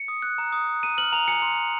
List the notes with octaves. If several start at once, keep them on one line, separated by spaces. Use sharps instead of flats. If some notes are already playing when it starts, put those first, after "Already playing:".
Already playing: C#7
D#6
F#6
A#5
D#6
F#6
A#5 D#7
F6 F#7
A#5 F7
G#5 C#7
C6
F6